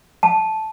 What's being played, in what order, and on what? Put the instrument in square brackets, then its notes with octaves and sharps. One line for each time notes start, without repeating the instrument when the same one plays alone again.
[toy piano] A5